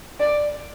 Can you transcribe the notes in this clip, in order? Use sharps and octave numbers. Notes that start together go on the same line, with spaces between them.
D5